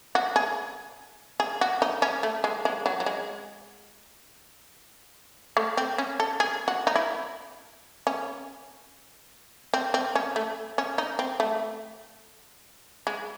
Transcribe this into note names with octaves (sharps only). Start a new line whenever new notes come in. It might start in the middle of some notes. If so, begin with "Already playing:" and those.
F#4
G#4
G#4
F#4
D#4
C#4
A3
G#3
G#3
F#3
F#3
G#3
A3
C4
C#4
A4
G#4
F#4
D#4
E4
C#4
C4
C4
C#4
A3
C#4
D#4
C4
A3
G#3